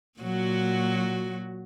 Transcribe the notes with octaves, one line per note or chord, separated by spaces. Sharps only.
A#2 F#3 F#4